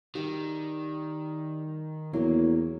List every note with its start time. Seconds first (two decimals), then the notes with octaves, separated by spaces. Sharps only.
0.15 D#3 G3 G4
2.13 E2 F#3 A#3